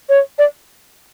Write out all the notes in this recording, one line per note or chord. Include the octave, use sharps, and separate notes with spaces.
C#5
D5